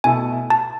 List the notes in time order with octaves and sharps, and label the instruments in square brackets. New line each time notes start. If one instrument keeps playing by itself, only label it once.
[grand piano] B2 A3 E4 A4 [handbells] G#5
[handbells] A5